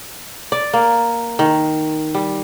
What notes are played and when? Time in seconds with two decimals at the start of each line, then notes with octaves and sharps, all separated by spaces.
0.52 D5
0.73 A#3
1.39 D#3
2.15 G3